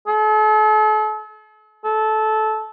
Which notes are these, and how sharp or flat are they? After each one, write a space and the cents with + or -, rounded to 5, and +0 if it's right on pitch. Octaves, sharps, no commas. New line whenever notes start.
A4 -40
A4 -20